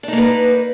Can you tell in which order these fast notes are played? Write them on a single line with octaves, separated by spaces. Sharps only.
D4 D#4 A#3 B4